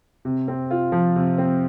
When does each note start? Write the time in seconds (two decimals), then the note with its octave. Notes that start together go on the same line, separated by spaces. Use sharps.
0.25 C3
0.48 C4
0.71 F4
0.92 F3
1.16 C3
1.38 C4